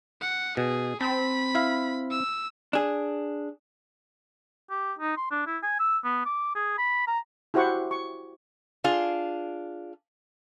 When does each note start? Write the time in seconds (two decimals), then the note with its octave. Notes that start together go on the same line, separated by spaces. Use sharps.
0.21 F#5
0.57 B2 G#4
1.01 C4 A5 B5
1.55 E4 F5
2.11 E6
2.73 D4 G#4
4.70 G4
4.99 D#4
5.17 C6
5.31 D4
5.47 E4
5.63 G#5
5.80 E6
6.04 B3
6.25 D6
6.55 G#4
6.78 B5
7.07 A#5
7.54 E4 F#4 G4 C5 F#5 C#6
7.91 C#6
8.84 D4 F4 G#4